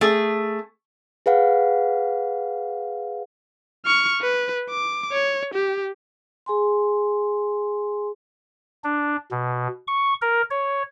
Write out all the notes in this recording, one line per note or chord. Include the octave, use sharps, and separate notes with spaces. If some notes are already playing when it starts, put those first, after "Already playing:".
A3 G#4
G#4 B4 F5 F#5
C#6 F6
B4
D6
C#5
G4
G#4 G#5 C6
D4
B2
C#6
A#4
C#5